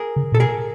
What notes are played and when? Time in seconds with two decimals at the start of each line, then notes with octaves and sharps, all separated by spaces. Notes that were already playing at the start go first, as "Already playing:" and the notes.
Already playing: G#4 A#4
0.16 C#3
0.32 A#2 A4
0.39 B2 G#4 A#4